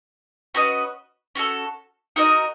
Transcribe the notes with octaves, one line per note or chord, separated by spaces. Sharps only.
C#4 F#4 B4 D#5
C#4 F#4 A4
D#4 F#4 A#4 D#5